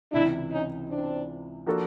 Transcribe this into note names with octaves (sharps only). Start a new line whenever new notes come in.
C#2 C3 E3 D4 E4
C#4 D#4
C4 D4
F3 A#3 D4 F#4 A4